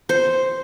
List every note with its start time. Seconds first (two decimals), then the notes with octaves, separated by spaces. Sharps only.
0.09 C5